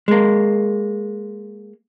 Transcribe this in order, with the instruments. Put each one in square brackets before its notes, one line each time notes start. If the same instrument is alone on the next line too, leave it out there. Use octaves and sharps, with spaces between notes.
[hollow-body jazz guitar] G#3 A#3